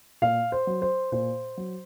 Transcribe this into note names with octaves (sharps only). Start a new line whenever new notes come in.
A#2 F5
C5
F#3
C5
A#2 C5
F#3